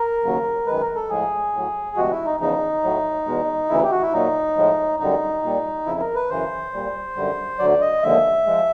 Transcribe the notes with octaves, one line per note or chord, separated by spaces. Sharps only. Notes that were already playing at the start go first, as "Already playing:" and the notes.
Already playing: A#4
D#2 C#3 F#3
F#2 D#3 G#3 B4
A#4
A4
A2 F3 G#3 G#4
A2 F#3
D2 C3 F3 G#3 F#4
E4
D#4
E2 C#3 F3 D#4
A2 F#3
E2 B2 G#3
D2 C#3 E3 E4
G4
F#4
E4
A#2 F#3 D#4
A2 F3 G#3
F#2 D3 G3 D#4
A#2 G3
F2 C#3 F3 E4
A#4
B4
F#2 C#3 E3 C5
A#2 G3
F#2 D3 G3
D2 D3 F#3 D5
D#5
D#2 D3 F3 G#3 E5
F3 G#3